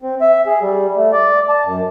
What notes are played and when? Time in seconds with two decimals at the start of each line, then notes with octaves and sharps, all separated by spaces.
0.02 C4
0.21 E5
0.47 G#4
0.62 G3
0.96 A3
1.13 D5
1.49 A5
1.65 F#2